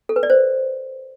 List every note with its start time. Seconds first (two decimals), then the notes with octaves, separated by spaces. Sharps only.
0.09 A4
0.16 B4
0.23 D5
0.30 C5